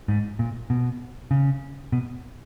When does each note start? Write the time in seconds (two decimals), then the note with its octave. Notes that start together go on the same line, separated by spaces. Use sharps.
0.08 G#2
0.39 A#2
0.70 B2
1.31 C#3
1.92 B2